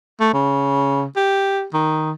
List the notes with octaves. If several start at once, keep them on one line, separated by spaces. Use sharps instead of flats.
A3
C#3
G4
D#3